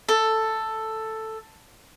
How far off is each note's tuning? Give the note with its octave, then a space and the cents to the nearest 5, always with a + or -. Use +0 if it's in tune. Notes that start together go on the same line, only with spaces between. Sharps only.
A4 +5